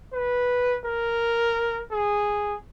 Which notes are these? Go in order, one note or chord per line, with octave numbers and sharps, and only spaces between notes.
B4
A#4
G#4